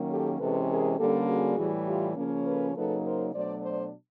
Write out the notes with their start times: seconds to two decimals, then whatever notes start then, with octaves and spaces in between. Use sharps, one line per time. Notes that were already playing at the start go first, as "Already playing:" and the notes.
Already playing: D#3 F#3 A#3 C#4
0.09 G4 A4
0.39 C3 E3 G#3 C#4 A4 B4
0.69 G#4 A#4
0.98 D3 G3 A#3 C#4 G4 A4
1.27 F#4 G#4
1.57 A2 E3 G3
1.87 F4 G4
2.16 C#3 F3 A#3 C#4
2.45 A4 B4
2.75 C#3 F#3 A#3 D#4 A4 B4
3.04 A#4 C5
3.33 B2 F#3 A3 D4 C5 D5
3.63 C5 D5